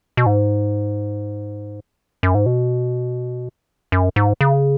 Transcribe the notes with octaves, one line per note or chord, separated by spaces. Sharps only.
B2
G#2
F#2
G#2
B2
F#2
G#2
C#3